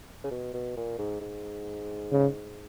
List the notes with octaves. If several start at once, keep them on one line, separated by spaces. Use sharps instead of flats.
C#3
B2
B2
A#2
G#2
G#2
C#3